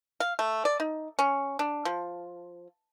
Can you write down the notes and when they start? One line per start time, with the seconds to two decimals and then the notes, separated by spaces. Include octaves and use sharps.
0.20 F5
0.39 A3
0.65 D5
0.80 D#4
1.19 C#4
1.59 D4
1.85 F3